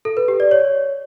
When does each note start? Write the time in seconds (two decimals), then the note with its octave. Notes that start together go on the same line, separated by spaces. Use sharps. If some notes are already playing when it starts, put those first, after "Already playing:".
0.05 A4
0.17 B4
0.28 G4
0.40 D5
0.51 C#5